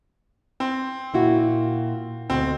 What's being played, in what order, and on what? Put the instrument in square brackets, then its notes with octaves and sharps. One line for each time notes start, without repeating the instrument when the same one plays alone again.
[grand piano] C4
[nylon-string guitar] A#2 E4 F#4
[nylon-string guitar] D2 B2 [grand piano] C4